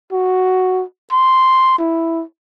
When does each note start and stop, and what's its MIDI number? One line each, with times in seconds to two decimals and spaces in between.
0.13 0.83 66
1.12 1.76 84
1.79 2.24 64